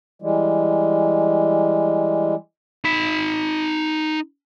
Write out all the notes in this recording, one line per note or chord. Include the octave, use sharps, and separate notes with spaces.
E3 G3 G#3
D#4 B5